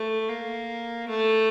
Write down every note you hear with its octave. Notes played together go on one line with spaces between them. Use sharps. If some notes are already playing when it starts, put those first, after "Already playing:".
Already playing: A3
A#3
A3